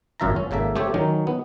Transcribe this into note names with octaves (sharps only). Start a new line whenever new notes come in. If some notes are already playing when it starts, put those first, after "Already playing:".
G#1 F#2 F4 E5 A5 A#5
C#4
G#1 C#3 A#3 A4 E5
A3 C4 G4 A4 C5 C#5
D#3 F#3 C#4 D#4
B3